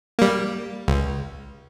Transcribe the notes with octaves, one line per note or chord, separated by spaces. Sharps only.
G3 A#3
C#2